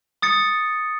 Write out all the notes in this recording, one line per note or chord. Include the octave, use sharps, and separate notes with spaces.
D#6 A6 C#7